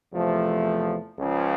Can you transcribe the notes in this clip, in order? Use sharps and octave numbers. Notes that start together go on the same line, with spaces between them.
E2 C3 F3 A3
C#2 C#3 F3